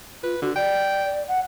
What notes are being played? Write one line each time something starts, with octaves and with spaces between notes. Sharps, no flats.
F4 B4
D3 F#4
D5 G5
F#5